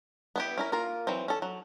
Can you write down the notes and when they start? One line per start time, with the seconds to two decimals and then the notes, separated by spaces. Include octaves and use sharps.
0.36 B3 E4 G4
0.58 C#4 E4 A#4
0.72 A#3 F4 A#4
1.07 E3 F#3 C4
1.28 C#4 A4
1.42 F#3